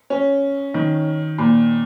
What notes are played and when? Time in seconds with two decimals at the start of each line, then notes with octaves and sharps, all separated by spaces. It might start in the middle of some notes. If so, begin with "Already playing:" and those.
0.10 C#4
0.74 D#3
1.38 A#2